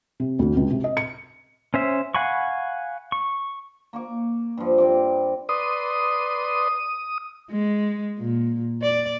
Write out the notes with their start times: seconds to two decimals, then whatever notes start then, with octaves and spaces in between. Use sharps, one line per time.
0.20 C3
0.39 D2
0.57 C#2
0.70 C3
0.84 D#5
0.97 C#7
1.74 C#4 C5 E5
2.15 F5 F#5 G#5 B5 C#6
3.12 C#6
3.93 A#3 C#6 D6
4.57 G2 F3
4.78 G2 C4 D6
5.49 B4 D5 C6 D#6
7.51 G#3
8.18 A#2
8.82 D5